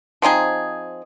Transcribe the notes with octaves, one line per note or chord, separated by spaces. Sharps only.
F3 C4 D#4 G#4